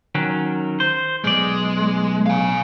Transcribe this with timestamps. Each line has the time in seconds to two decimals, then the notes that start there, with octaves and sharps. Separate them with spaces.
0.15 D#3 F#3 C#4
0.80 C5
1.24 B1 G#3 D5
2.26 F5 G#5